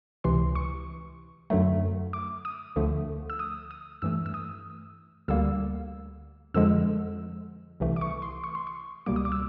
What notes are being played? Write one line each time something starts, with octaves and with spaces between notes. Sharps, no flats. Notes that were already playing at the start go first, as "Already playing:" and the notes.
C#2 C3 E3 C6
C#6
F#2 D3 F#3 A3
D6
D#6
D2 D3 F3 A3
E6
D#6
D#6
G2 E3 A3 E6
E6
D#6
D2 D3 G3 A#3 E6
F2 D3 F3 G#3 E6
C2 C3 E3 A3
D6
C#6
C6
C#6
C6
C#6
C#2 B2 G3 A#3 D6
D#6
D6
E6